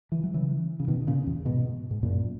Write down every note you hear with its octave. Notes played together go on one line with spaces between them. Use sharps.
E3
F#3
C#3 E3
C#3
B2 D#3
A#2 C#3
E2
G#2 B2
G#2
F#2 A#2